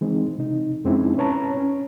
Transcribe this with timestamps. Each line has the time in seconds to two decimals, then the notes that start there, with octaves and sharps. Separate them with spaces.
0.01 E3 G#3 C4 D#4
0.38 C3 D#4
0.84 F2 G#3 C4 C#4 D#4 E4
1.17 C#4 B4 C#5 A5 A#5
1.57 C#4